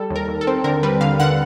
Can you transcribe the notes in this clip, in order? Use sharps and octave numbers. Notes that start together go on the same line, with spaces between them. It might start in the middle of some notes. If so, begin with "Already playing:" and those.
Already playing: G3 A4
D#2
A#4
D#2
A4
C4
D3 A#4
G3 B4
D3 F5
D3 F#5